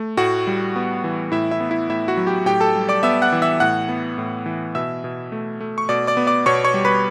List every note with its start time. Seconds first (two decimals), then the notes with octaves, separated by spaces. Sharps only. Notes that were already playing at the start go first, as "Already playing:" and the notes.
Already playing: A3
0.17 A2 F#4 F#5
0.47 G3
0.76 B3
1.04 E3
1.32 A2 E4 E5
1.51 E4 E5
1.60 B3
1.70 E4 E5
1.89 A2 E4 E5
2.08 F#4 F#5
2.17 F#3
2.27 G4 G5
2.46 A2 G4 G5
2.60 A4 A5
2.76 G3
2.89 D5 D6
3.03 B3 E5 E6
3.22 F#5 F#6
3.32 E3
3.42 E5 E6
3.60 A2 F#5 F#6
3.89 B3
4.18 A2
4.46 E3
4.75 B2 E5 E6
5.04 B2
5.32 A3
5.60 A3
5.78 C#6
5.89 B2 D5 D6
6.07 D5 D6
6.17 B3
6.27 D5 D6
6.46 B2 C#5 C#6
6.64 C#5 C#6
6.74 G3
6.85 B4 B5